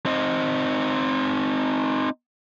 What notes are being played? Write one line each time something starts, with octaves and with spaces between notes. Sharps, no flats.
C4 D#4